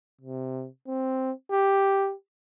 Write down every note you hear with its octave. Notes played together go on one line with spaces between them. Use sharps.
C3
C4
G4